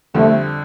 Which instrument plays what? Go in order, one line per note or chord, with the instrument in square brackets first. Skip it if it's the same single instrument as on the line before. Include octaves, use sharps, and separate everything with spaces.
[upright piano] F2 D3 G3 C4 [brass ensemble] A3